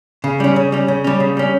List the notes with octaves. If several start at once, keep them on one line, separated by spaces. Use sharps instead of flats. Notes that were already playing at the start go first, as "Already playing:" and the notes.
C#3
G3 C#4
C#3
G3 C#4
C#3
G3 C#4
C#3
G3 C#4